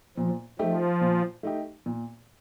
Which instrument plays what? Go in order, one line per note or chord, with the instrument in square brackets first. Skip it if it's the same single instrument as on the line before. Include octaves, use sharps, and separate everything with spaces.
[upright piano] A#2 [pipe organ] F3
[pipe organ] F3 [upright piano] A3 D#4 G4
[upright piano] A#2
A3 D#4 G4
A#2